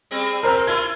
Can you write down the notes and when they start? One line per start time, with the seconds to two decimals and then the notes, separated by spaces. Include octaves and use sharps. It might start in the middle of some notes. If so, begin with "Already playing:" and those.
0.11 G3 C4 G#4
0.43 F2 C3 A4 A#4 C5 F6
0.67 E4 F4 A4 G#6